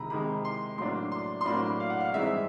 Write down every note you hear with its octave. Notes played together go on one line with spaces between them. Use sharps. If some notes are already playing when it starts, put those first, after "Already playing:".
Already playing: C3 D#3 G#3 A#5 B5
C3 D#3 G#3 B5
C6
A2 F#3 A#3 D4 C6
C6
C6
A2 F#3 A#3 D4 B5
F5
F#5
F5
G2 E3 G#3 C4 D#4 E5